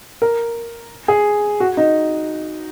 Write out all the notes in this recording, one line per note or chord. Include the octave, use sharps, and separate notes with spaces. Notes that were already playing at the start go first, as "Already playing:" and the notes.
A#4
G#4
F#4
D#4